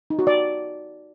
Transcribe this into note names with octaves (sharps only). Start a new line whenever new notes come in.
D#4
F#4
D5